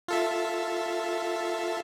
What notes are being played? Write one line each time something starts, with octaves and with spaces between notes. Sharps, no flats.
F4 A4 E5